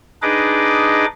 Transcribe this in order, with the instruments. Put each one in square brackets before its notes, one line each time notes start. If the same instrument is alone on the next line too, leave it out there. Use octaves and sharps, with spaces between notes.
[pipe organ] D4 D#4 G#4 B4 D#5 D6